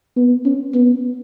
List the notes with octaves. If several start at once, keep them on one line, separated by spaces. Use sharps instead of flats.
B3
C#4
B3